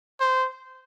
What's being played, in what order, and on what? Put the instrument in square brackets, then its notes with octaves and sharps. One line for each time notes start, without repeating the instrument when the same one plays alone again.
[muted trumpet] C5